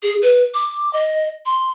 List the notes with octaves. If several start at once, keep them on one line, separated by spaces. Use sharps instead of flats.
G#4
B4
D6
D#5
C6